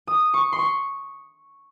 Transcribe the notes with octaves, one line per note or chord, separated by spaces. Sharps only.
D#6
C#6
C6
C#6